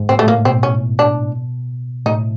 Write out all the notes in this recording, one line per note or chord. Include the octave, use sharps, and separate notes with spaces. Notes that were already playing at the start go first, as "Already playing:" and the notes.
Already playing: G#2
A2 C4
A3
A2 A#3
B2 C4
C#4
D4
A2 D#4